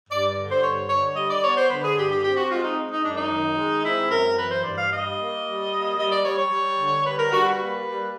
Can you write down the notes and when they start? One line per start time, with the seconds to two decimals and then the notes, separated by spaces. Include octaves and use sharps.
0.10 G2 D5
0.37 D3
0.50 C5
0.63 G2 C#5
0.90 D3 C#5
1.16 G3 D#5
1.30 D5
1.43 B3 C#5
1.56 C5
1.70 D3 B4
1.84 G#4
1.97 G2 G4
2.11 G4
2.24 C4 G4
2.37 F#4
2.50 G#3 F4
2.64 D#4
2.77 G#3
2.90 D#4
3.03 F#2 D4
3.17 D#4
3.31 D#3
3.57 G#3
3.84 C4 E4
4.10 F#2 A#4
4.37 E3 B4
4.51 C5
4.64 G2 D5
4.78 F5
4.91 G3 D#5
5.17 A#3
5.45 G3
5.71 A#3
5.98 G3 D#5
6.11 D5
6.25 G3 C#5
6.38 C#5
6.51 G3
6.78 D3
7.05 G3 B4
7.19 A#4
7.32 G3 F#4
7.45 B4
7.59 A#3
7.85 G3